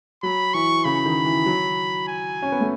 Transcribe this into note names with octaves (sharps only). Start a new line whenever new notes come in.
F#3 B5
E3 C#6
C#3 B5
D#3
E3
F#3
G#5
C#4
B3
A3